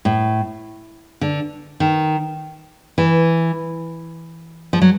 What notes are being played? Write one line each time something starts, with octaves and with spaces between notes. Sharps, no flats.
A2
D3
D#3
E3
F3
F#3